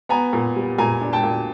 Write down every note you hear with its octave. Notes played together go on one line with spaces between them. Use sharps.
B3 G#5 A#5
A#2
G3
A#2 G#5 A#5
D4
G5 A5
A#2